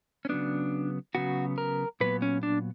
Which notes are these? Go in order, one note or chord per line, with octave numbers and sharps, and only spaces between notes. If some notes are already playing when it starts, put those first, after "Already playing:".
C#4
C#3 F#3 B3 D4
C#3 F#3 B3 F#4
A#4
A#2 F#3 B3 B4
C#4
D4